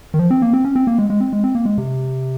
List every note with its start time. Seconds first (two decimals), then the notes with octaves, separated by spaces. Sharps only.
0.14 D#3
0.19 F3
0.30 C4
0.42 A#3
0.53 C4
0.65 C#4
0.76 C4
0.87 A#3
0.98 G#3
1.10 G#3
1.20 C4
1.33 G#3
1.44 C4
1.55 A#3
1.65 G#3
1.78 C3